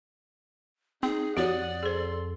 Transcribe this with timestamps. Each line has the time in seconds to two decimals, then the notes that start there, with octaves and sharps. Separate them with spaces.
1.03 C4 D#4 G#4
1.37 F2 F#4 G4 C#5 D5 F#5 D#6
1.83 G#4 A4 C5 C6